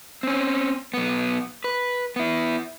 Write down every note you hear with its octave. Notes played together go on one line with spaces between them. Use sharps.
C4 C#4
B1 B3
B4
B3 E4